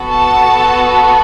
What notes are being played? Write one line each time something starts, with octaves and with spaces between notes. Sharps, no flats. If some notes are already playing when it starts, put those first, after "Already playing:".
Already playing: B3 F#4 A4
A5